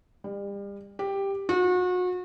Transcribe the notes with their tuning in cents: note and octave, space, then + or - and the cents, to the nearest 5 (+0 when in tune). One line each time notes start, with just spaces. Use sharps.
G3 +35
G4 +5
F#4 -35